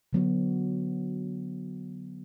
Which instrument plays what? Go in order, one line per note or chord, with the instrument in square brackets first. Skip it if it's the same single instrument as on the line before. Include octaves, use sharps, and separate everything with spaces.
[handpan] D3 F#3 B3 F#4